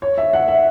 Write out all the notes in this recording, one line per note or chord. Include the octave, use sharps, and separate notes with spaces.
C#5
E5
F#5
E5